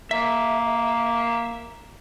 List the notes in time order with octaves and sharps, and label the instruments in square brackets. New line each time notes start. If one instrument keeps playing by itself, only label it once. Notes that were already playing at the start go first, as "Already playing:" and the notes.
[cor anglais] A#3 [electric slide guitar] E5